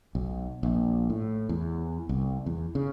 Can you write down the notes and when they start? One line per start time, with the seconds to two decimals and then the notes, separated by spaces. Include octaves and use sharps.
0.15 B1
0.63 A#1
1.10 A2
1.49 E2
2.09 C2
2.46 E2
2.75 C#3